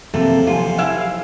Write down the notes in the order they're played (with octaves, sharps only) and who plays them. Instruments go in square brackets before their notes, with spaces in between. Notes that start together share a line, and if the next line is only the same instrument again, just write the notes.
[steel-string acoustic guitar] C3 A#3 A4 [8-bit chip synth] F3 F#3 G4 [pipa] A3
[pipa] F4 [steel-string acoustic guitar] A4 C5 G#5
[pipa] E4 E5 F5